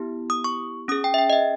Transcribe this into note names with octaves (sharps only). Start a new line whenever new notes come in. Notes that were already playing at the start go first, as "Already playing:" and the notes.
Already playing: B3 E4 G4
D#6
C#6
C#4 G#4 D#6
G5
E5
G5
D#5
E5